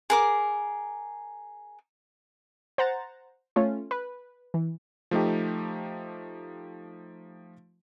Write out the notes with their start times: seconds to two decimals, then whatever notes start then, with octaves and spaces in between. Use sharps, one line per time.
0.10 G#4 A#4 D6
2.78 C5 F#5 A#5 A6
3.56 A3 C#4 F4
3.91 B4
4.54 E3
5.11 F3 A3 D#4 G4